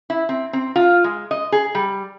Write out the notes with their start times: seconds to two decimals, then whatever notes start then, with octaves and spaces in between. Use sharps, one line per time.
0.10 E4
0.29 C4
0.53 C4
0.76 F4
1.04 G#3
1.31 D#5
1.52 G#4
1.75 G3